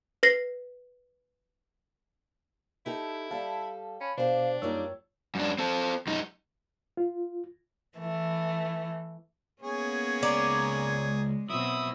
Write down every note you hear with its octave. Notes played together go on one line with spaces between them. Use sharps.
B4 A#6 C7
D#4 E4 G4 A4
G3 G4 A4 F5 A5
C#4 B5
B2 D4 G4 C5 F5
F#2 G3 A#3 D#4 F4 C#5 E6
F#2 D4
C4 A4
F#2 D#4
F4
E3 A3
A#3 B3 C#4 G#4 C#5
C#2 D5 A#5
G#3
B2 F#3 C4 E4 D#6 E6